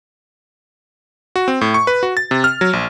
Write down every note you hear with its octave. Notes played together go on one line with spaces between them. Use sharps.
F#4
C4
A2
C#6
B4
F#4
A6
C3
F6
F#3
A#1